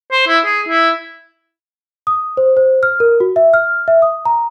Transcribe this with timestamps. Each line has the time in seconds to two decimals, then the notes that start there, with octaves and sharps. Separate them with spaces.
0.11 C5
0.27 E4
0.45 G#4
0.68 E4
2.07 D#6
2.37 C5
2.57 C5
2.83 F6
3.00 A#4
3.20 F#4
3.36 E5
3.54 F6
3.88 E5
4.02 D#6
4.25 A#5